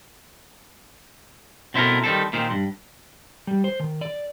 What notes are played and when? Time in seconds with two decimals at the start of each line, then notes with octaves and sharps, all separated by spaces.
1.74 B2 C4 E4 A4 A#4
2.04 D#3 G3 C4 A4
2.33 A#2 D#3 C4
2.50 G2
3.47 G3
3.64 C5
3.80 D#3
4.01 D5